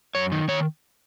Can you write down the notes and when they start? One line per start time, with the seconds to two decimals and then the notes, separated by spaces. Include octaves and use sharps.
0.15 F#2 C#5
0.32 D#3
0.48 D#3 C#5